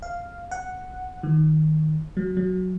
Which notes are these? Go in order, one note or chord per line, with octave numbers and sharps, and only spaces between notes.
F5
F#5
D#3
F#3
F#3